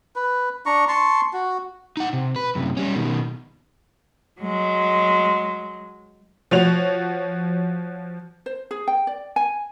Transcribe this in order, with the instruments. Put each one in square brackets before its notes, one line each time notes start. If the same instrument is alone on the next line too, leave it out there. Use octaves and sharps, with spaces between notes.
[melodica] B4
D4 A#5 C#6
A5 C6 C#6
F#4
[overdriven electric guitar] D#4 F#5
C3
B4
F#2 C3
G3 C#4
B2 D#3
[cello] F#3 G#3
[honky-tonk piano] F3 F#4 C#5 F7
[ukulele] C5
G#4
G5
D5
G#5